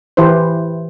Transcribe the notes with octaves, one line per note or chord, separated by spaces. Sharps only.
E3 E4 G4 B4 C5